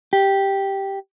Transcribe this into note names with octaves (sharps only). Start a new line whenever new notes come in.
G4